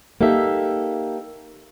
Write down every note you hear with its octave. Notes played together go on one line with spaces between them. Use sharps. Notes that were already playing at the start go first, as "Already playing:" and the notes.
A#3 D#4 G4 A4 E5